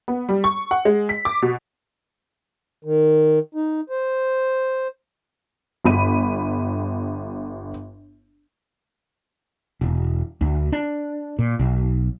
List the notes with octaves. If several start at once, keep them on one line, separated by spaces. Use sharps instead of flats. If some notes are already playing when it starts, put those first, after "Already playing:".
B3
G3
C#6
F#5
G#3
B6
D6
B2
D#3
D#4
C5
G1 B5 D#7
E1
D2
D4
A#2
B1